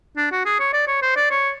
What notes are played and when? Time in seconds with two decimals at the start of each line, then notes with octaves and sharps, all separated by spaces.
0.17 D4
0.31 F#4
0.45 G#4
0.60 C#5
0.73 D5
0.88 C#5
1.02 C5
1.16 D5
1.30 C#5